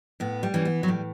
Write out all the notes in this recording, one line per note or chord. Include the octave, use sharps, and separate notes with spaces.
A2 B3
G3
E3 C#4
B3
F#3
A2 G3